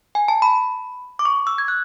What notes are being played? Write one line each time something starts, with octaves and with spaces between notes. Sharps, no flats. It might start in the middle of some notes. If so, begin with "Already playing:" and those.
G#5
A5
B5
D6
C#6
E6
G#6
F#6